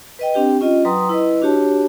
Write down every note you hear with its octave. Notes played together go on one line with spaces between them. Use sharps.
B4 D#5 G5
C4 D4 G4 G5
C#4 F4 D#5
F#3 B4 G5 A#5 C6 D#6
E4 B4 D#5
D4 F#4 G4 C#5 A5